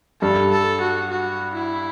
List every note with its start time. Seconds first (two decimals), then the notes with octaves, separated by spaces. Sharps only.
0.21 G2 A4
0.51 A4
0.81 F#4
1.10 F#4
1.55 E4